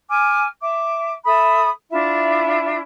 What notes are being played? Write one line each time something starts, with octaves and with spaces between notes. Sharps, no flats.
G#5 D6 F6
E5 D6
A4 E5 B5 D#6
D4 E4 F4 E5